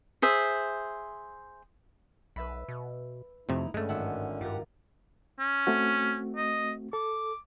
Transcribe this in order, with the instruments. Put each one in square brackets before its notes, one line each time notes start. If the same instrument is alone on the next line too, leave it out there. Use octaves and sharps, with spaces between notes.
[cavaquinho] G#4 C5 E5
[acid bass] B1 [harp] B4 E5 B5
[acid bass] B2
[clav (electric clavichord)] F2 C3 [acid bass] A3 [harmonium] D#4 E4
[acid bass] G2 [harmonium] D3 C#4 [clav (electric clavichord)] G#3 A3
[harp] G#1 E5 F#5
[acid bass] G2 [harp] F4 A#4 [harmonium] G4 F#5
[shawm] C#4
[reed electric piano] A3 C4 F#4
[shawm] D#5
[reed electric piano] A4 [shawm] D6